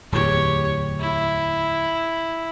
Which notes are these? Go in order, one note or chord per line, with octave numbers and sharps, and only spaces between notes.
D1 E2 G4 C#5
E4